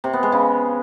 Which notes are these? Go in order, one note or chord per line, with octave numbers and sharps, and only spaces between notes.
C3
B3
G#3
C#3